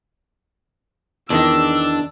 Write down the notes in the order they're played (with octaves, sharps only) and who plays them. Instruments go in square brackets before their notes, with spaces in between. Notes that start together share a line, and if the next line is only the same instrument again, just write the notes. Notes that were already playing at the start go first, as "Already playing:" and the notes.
[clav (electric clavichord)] E2 D#3 D#5 [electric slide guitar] D4 [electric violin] E6